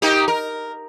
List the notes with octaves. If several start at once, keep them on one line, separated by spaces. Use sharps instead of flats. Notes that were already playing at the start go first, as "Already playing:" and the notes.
A#3 D#4 G4
A#4